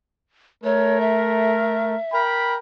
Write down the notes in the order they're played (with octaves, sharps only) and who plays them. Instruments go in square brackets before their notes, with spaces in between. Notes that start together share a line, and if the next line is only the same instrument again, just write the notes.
[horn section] A3 A#4 [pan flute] C#5
[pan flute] E5
[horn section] A#4 G5 B5